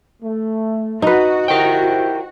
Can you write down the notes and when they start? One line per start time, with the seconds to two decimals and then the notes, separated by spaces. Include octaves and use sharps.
0.23 A3
1.02 D#4 F#4 B4
1.48 E4 G4 A#4 C5 G5